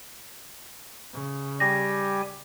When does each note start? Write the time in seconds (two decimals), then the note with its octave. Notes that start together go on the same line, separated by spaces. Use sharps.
1.13 C#3
1.60 G3 G4 G#5 A#6